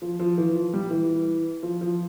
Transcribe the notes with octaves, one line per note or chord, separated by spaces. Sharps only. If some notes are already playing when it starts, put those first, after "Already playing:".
F3
F3
E3
F3
G3
E3
F3
F3